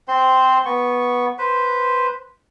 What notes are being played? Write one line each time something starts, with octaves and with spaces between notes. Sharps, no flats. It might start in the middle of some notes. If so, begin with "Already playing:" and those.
C4 C5 C6
B3 C#6
B4 C5